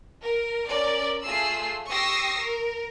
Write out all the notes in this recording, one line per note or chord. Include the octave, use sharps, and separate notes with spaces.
A#4
C#4 A#4 D5
A3 F4 G#4 E6 C7
G4 C#6 D#6 E6 A#6 C7
A#4